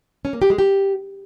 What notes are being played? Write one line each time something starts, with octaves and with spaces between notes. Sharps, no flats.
C#4
A#3
G4
G#3
G4